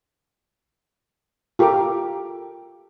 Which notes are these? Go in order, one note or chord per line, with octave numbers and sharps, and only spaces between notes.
F4 G4 A4 A#4 D6